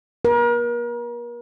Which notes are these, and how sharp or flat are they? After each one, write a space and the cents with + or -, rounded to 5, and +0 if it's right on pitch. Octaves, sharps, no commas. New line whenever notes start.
A#4 +40